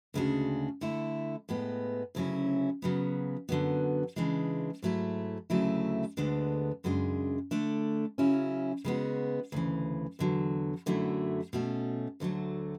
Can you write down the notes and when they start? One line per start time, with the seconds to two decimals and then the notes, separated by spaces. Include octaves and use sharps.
0.14 D2 C#3 G#3 D4 F#4
0.81 D3 A3 E4
1.49 A2 G#3 B3
2.15 D2 C#3 F#3 C#4 E4
2.82 C#3 F#3 B3
3.49 F#2 D3 F#3 B3
4.16 C#3 E3 G#3 D4
4.82 G#2 F#3 A3 E4
5.50 D2 C#3 F#3 A3 E4
6.17 D2 D3 G#3 B3 D4
6.84 F#2 C#3 G#3 D4
7.51 D3 A3 D4
8.18 C#3 F#3 C#4 E4
8.85 C#3 G#3 B3 F#4
9.52 D2 C#3 E3
10.19 E2 D3 F#3
10.86 F#2 D3 F#3 A3 E4
11.53 B2 A3 C#4
12.20 D2 D3 F#3 A3